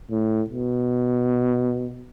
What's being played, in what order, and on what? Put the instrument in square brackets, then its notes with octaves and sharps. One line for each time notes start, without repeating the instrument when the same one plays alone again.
[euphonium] A2
B2